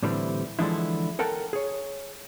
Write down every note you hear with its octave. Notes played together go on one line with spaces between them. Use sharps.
A2 D3 E3 G3 C4
D3 E3 F3 G#3 D4 E4
A4 A#4 F#5 G5 A5
G#4 C#5